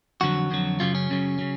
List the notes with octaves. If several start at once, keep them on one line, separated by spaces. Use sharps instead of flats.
F2 D3 F#3 F#4
F2 D3 F#3
F#2 C#3 F#3 F4
C#4
F#2 C#3 F#3
C#3 F#3